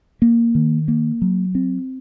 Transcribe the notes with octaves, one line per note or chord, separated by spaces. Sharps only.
A#3
D#3
A#3
F#3
C4